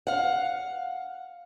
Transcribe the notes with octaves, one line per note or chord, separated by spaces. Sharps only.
F5 F#5